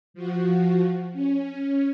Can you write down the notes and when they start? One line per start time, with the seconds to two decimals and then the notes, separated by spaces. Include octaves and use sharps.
0.14 F3 F#4
1.13 C#4